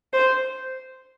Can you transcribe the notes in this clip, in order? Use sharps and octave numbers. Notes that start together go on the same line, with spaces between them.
C5